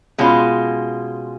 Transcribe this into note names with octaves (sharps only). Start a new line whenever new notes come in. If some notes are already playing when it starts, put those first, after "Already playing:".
B2 G#3 C#4 F4